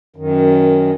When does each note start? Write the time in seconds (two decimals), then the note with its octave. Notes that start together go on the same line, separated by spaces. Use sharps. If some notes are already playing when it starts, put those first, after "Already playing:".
0.16 F#2 D#3